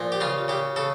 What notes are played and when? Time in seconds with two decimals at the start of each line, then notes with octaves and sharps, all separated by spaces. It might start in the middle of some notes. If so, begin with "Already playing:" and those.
Already playing: A#2 F3
0.12 G4
0.21 C#3 F4
0.48 C#3 G4
0.76 C#3 A4